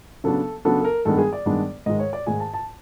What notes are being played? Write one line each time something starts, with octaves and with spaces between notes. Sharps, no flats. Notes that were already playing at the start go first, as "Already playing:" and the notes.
C#3 F#3 B3 D4 A4
C#3 F#3 B3 D4 A4
A4
A#4
G2 D#3 G#3 B3 D4 A4
G#4
D5
G2 D#3 G#3 B3 D4
G#2 D#3 G#3 D#5
C#5
D5
G#2 D#3 G#3 G#5
A5
A5